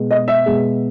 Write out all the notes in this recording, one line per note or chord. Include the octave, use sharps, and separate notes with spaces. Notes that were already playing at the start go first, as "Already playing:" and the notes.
Already playing: B2 G#3
D#5
E5
B2 G#3